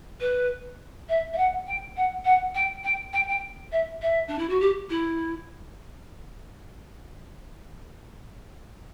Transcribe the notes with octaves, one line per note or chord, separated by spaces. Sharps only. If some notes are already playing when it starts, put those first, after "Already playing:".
B4
E5
E5
F#5
G5
F#5
F#5
G5
G5
G5
G5
E5
E5
D4
E4
F#4
G4
E4